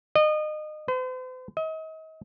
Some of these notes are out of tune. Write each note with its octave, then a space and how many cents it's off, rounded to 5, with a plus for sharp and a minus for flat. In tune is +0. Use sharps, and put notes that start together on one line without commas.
D#5 -30
C5 -45
D#5 +35